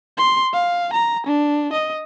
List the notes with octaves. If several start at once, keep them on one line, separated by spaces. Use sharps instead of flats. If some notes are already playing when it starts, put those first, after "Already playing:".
C6
F5
A#5
D4
D#5